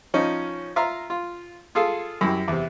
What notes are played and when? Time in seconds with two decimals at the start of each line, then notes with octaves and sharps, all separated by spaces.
0.14 F3 C#4 D#4
0.76 F4 E5 F5 A#5
1.10 F4
1.75 F4 G#4 A4 F5
2.21 F#2 E4 G4
2.48 E2 C3